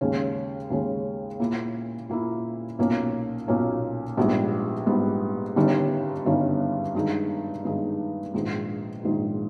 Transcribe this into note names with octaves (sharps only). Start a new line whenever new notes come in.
D#2 C#3 G#3 C#4
D#2 C#3 G#3 C#4
A#2 A#3 E4
A#2 A#3 E4
B1 A#2 A#3 C#4
B1 A#2 A#3 C#4
A#1 G#2 G3 B3
A#1 G#2 G3 B3
G1 G2 D#3 G3 C#4
G1 G2 D#3 G3 C#4
G2 D#3 G#3 D#4
G2 D#3 G#3 D#4
A#1 G#2 D#3
A#1 G#2 D#3